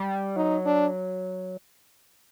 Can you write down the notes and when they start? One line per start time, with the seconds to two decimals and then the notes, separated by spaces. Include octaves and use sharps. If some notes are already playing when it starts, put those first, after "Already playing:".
Already playing: G3
0.36 F#3 D#4
0.66 D4